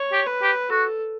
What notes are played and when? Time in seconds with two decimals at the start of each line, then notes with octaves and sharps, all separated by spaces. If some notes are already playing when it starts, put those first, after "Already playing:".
Already playing: C#5
0.12 G4
0.27 B4
0.42 G4
0.70 F#4 A4